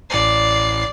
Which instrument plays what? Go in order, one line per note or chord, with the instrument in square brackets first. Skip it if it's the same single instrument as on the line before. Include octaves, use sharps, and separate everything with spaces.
[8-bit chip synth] A1 C7 [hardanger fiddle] D5